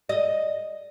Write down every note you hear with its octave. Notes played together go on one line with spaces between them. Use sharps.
D#5